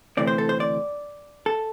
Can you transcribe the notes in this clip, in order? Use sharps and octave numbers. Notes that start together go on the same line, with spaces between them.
D2 C3 E3 A3 C4 D5
C5
A4
C5
D5
A4